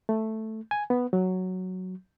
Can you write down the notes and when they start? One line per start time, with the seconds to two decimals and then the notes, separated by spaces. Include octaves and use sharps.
0.09 A3
0.71 G#5
0.90 B3
1.13 F#3